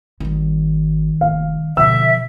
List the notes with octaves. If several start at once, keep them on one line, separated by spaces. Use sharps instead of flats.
G#1 D#3 G3
F1 F5
B2 D3 F3 E5 E6